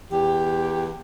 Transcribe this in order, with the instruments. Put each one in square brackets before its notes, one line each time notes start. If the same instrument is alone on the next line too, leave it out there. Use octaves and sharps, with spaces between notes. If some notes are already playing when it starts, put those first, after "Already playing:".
[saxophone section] E2 G4